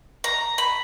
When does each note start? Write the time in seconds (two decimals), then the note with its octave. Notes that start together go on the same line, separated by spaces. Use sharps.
0.24 A#5
0.58 B5